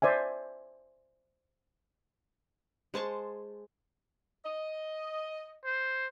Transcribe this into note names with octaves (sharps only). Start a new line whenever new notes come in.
C5 D5 E5 G#5
G#3 C5 A5 C#6
D#5
C5